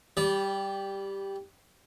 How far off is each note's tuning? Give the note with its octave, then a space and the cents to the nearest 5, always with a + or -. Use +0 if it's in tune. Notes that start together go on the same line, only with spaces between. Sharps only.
G3 +0 D5 -30